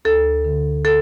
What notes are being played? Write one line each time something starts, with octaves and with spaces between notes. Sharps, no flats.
D2 A4
D3
A4